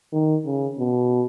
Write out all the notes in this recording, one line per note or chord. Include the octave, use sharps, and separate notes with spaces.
D#3
C#3
B2